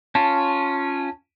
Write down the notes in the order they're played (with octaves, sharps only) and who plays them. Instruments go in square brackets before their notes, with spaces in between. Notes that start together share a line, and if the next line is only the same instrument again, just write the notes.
[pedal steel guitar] C#4 F4 [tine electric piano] A5